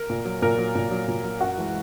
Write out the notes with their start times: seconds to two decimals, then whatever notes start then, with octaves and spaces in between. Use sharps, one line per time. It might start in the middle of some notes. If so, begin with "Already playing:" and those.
Already playing: A#4
0.10 A#2
0.25 F#3
0.42 A#2 A#4
0.58 F#3
0.75 A#2
0.91 F#3
1.08 A#2
1.24 F#3
1.41 F#2 F#4
1.58 E3 G#3